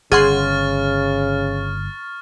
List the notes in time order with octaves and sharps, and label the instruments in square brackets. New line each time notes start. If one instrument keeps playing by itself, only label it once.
[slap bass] G1 [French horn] C#3 [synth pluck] G#4 F#5 C6 [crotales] C#6 F6 A6